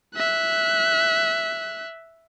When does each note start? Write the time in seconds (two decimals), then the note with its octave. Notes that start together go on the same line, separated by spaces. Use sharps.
0.16 E5 F#6